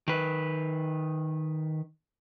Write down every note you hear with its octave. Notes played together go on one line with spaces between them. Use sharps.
D#3 B4